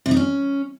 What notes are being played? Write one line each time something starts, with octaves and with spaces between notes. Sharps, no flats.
C3
D#4
C#4